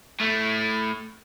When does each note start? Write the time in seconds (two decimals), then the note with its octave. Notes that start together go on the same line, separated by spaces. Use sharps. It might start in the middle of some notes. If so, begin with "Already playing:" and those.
0.20 A2 A3